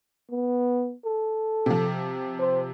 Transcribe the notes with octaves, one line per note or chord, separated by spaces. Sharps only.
B3
A4
C3 F3
C5